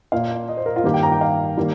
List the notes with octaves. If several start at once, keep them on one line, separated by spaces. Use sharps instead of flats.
A#2 A#3 F5
D#5
C5
A#4
F4
G2 D#3 A#3 G4
G5
A#5
G5
F5
D#3 G3 A#3